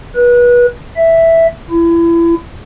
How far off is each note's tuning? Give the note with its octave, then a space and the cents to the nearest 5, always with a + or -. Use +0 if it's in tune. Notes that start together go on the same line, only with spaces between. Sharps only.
B4 -30
E5 +0
E4 +30